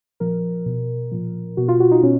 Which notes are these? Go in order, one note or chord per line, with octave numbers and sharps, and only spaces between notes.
A#2 F3 A#4
B2
A#2 F3
B2 F#4
F4
F#4
D#4
B2 C#4